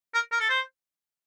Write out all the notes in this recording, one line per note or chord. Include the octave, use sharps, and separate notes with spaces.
A#4
A#4
A4
C5